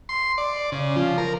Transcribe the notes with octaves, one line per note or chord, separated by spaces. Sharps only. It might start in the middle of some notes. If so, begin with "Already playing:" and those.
C6
D5
C#3
F3
A#4